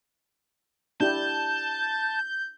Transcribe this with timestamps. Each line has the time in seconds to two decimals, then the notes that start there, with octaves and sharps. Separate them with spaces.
1.00 D4 E4 G4 A5 G6